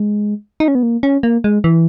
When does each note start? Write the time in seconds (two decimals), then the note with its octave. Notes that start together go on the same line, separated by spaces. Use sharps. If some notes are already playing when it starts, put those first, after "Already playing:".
Already playing: G#3
0.60 D#4
0.68 C#4
0.75 B3
0.83 A#3
1.03 C#4
1.23 A#3
1.44 G#3
1.64 E3